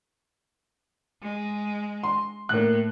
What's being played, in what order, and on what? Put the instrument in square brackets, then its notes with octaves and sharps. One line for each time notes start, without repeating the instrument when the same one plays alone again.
[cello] G#3
[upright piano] C6
[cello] A2 [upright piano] A#3 F#6